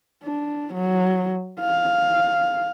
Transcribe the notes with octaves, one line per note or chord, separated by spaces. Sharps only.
D4
F#3
F5